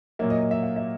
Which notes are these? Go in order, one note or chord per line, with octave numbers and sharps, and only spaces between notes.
A#2 F#3 A#3 E5
D#5
D#5
E5
F5
E5